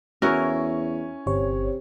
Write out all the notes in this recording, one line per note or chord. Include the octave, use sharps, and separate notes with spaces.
E2 C#4 E4 F#4 A#4 G#5
G1 C3 C#5